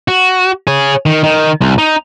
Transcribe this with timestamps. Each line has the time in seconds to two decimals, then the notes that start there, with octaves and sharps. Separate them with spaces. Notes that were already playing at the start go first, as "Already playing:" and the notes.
0.08 F#4
0.67 G#4 C#5
1.06 D#3
1.24 D#3
1.61 C2
1.78 D#4